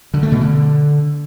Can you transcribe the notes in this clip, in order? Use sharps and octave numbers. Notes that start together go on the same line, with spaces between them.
D3
A3
B2
D3